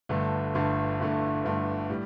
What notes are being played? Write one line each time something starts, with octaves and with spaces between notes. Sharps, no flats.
G1 G2 D3 A3
G1 G2 D3 A3
G1 G2 D3 A3
G1 G2 D3 A3
A2 G3